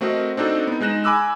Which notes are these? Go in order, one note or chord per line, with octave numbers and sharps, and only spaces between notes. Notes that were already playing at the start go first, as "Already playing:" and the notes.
A3 C4 F#4 A#4 D#5
C4 D4 D#4 F#4 A4
B3 D#4
G#3 D#4 F#6 A#6 E7
G#5 B5 D6 E6 F#6